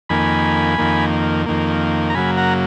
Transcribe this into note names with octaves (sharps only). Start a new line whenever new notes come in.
F2 D#3 A#3 G#5 B5
F2 D#3 A#3
F2 D#3 A#3
A#5
F#2 C#3 F#3 A#3 G#5 B5
F#5 A#5